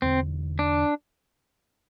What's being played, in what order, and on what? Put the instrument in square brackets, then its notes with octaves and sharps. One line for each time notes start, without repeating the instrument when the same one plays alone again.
[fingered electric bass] E1 E2 D3 [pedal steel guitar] C4
[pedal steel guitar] D4